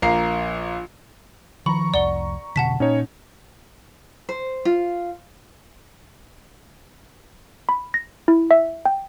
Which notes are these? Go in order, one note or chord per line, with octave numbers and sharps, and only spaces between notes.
A#1 A#3 A#5 C7
D#3 F3 A#5 B5 C#6
F1 C2 F2 D5 F#5 G7
F1 B2 D3 F#5 A5 B6
A#2 C#4 D#4 C#5
C5
F4
B5
A#6
E4
E5
G5